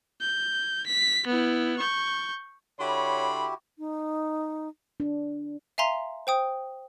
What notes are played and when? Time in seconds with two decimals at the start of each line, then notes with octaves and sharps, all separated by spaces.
0.20 G6
0.86 B6
1.27 B3 E4
1.79 C#6 G6
2.80 D3 E4 F#4 G4 C#5 B5 C6
3.79 D#4
5.00 D4
5.78 E5 F5 G#5 A#5 C6
6.27 C5 G5 D#6